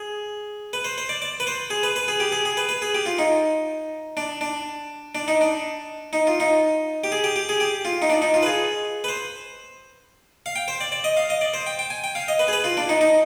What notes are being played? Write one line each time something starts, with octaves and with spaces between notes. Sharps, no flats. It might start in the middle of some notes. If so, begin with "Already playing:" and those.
Already playing: G#4
B4
C5
C5
D5
D5
B4
C5
G#4
B4
B4
G#4
G4
G#4
G#4
B4
B4
G#4
G4
F4
D#4
D4
D4
D4
D#4
D4
D#4
F4
D#4
G4
G#4
G4
G4
G#4
G4
F4
D#4
D4
D#4
F4
B4
G#4
B4
C5
F5
G5
C5
D5
D5
D#5
F5
D#5
D5
C5
G5
G5
G#5
G5
F5
D#5
B4
G#4
B4
F4
D4
D#4
D#4